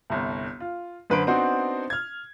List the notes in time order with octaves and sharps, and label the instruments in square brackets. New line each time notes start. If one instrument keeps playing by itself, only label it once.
[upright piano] G1 C2
F4
F#2 D3 B4 C5 B5 D7
B3 C4 D4 D#4 F#4 C5
F6 G#6